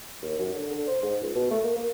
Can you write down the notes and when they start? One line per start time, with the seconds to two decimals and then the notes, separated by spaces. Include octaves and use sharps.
0.22 D#2
0.38 F#2
0.54 D3
0.71 D3
0.87 C5
1.02 G#2
1.21 C#2
1.35 B2
1.50 A3
1.64 A#3
1.76 A#3